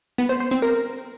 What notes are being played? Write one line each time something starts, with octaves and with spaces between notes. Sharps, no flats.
B3
C5
C5
C4
A#4